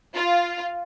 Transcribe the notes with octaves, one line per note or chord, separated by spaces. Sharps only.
F4